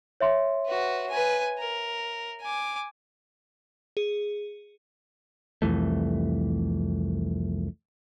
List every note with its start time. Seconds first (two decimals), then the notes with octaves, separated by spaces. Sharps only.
0.21 C#5 E5 C6
0.67 F#4 B4
1.10 B4 G#5
1.58 A#4
2.42 G#5 D6
3.97 G#4
5.62 C2 F2 E3 A3